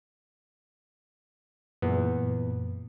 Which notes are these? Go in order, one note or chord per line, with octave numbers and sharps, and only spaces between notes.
F#2 A#2 E3 B3